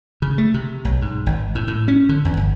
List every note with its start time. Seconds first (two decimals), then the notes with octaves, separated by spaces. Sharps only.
0.22 C#3
0.38 A3
0.54 C3
0.85 B1
1.02 G#2
1.26 G#1
1.55 A2
1.68 A2
1.88 C#4
2.09 D3
2.25 E2
2.37 G1